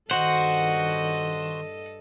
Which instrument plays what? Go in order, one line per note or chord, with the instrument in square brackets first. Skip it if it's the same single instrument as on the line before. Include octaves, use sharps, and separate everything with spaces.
[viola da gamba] G2 A4 D#5 [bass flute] D#3 [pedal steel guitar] F#4 C5 [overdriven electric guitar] F#5